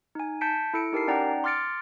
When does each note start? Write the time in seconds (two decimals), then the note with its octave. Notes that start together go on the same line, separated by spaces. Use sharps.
0.15 D#4 G#5
0.41 A5 G6 B6 C#7 D7
0.74 E4 A4 C#7 D7
0.93 D#4 G4 A#4 A5 C7
1.08 C#4 D#4 D5 F#5 G5 A#5
1.44 C6 D6 F6 A6 C#7 D7